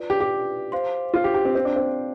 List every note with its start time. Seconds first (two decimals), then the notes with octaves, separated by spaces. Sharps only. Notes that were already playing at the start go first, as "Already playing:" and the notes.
Already playing: F4 B4 D5
0.10 G4
0.20 G4
0.72 C5 F5 C6
1.14 F4
1.24 G4
1.34 G4
1.45 C4
1.55 C4
1.65 D4
1.76 C4